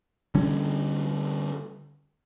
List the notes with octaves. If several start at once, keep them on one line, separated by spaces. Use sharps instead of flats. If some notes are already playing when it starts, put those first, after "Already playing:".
D3 G3 C#4